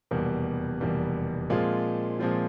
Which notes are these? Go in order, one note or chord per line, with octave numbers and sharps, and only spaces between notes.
F1 E2 B2 G3 A#3
F1 E2 B2 G3 A#3
A#2 F3 G#3 C4 F4
A#2 F3 G#3 C4 F4